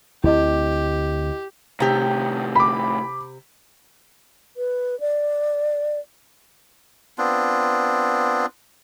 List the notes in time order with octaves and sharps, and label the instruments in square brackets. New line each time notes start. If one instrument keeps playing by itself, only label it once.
[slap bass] D2 C4 [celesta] E4 D#5 [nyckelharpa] G4
[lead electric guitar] A2 D#3 [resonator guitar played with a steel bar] C3 G4
[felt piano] B5 D6
[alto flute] B4
D5
[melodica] B3 C4 D4 F4